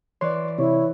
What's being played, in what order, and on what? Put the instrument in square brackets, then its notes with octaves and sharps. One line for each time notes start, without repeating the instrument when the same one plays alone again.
[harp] E3 B4 D5 [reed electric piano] C#5 C6
[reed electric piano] C3 [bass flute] E4 [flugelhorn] C#5